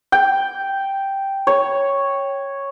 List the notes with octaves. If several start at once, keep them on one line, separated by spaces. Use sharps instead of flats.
G5
C#5